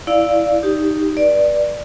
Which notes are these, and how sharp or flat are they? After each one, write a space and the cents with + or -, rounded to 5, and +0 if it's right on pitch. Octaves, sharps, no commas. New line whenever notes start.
E4 -5 D5 +0 F5 +0
D#4 +0 G4 +0
B4 -35 D5 +5